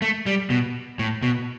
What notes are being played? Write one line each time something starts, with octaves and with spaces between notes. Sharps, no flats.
A3
G3
B2
A2
B2